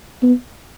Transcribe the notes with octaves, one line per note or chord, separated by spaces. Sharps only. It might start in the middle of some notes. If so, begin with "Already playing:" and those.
B3